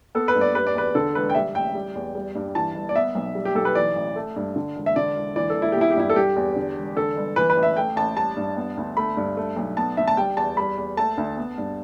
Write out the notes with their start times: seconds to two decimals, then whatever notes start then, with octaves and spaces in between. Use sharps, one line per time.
0.15 B3 A4
0.28 B4
0.35 G2
0.41 D5
0.55 G3 B4
0.67 D5
0.75 E2 B4
0.95 D3 A4
1.15 E1 B4
1.30 G5
1.35 G3 E5
1.55 A1 G5
1.75 G3
1.95 E2
2.15 G3
2.35 G2
2.55 E3 A5
2.75 G1
2.89 D5
2.95 B3 E5
3.15 B1
3.35 G3
3.45 G4
3.55 B1 A4
3.65 B4
3.75 E3 D5
3.96 A1
4.16 A3
4.36 G2
4.56 D3
4.76 E1
4.86 E5
4.96 D3 D5
5.16 E1
5.36 E3 D5
5.50 A4
5.56 E1
5.62 E4
5.72 B3 G4
5.81 E4
5.91 G4
5.96 G2 E4
6.09 A4
6.16 G3 G4
6.36 E2
6.56 D3
6.76 E1
6.96 D3 A4
7.16 G1
7.36 E3 B4
7.50 B4
7.57 A1
7.63 E5
7.77 A3 G5
7.96 A1 A5
8.17 G3 A5
8.36 G2
8.56 B3
8.77 D2
8.97 A3 B5
9.17 G2
9.37 A3
9.57 B1
9.77 B3 A5
9.97 D2 E5
10.08 A5
10.17 G3 G5
10.37 E2 A5
10.57 G3 B5
10.78 E2
10.97 A3 A5
11.18 D2
11.37 B3
11.58 G2